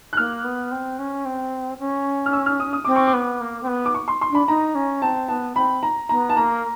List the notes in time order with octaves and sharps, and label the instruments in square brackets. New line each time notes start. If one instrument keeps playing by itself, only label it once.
[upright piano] F#6
[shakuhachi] A#3 [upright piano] F6
[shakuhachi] B3
C4
C#4
C4
C#4
[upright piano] F6
E6
F6
D#6
D#6
[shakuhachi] C4 [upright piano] D6
[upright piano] C#6
D6
[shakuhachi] B3
A#3
C4
B3
[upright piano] D6
C#6
C6
C6
[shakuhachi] D4 [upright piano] B5
[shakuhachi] D#4 [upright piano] A#5
[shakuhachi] C#4
[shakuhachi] C4 [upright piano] A5
[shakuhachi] B3 [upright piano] A5
[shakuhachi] C4 [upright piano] B5
[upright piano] A#5
[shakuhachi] B3 [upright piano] A#5
[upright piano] A5
[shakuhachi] A#3 [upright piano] A#5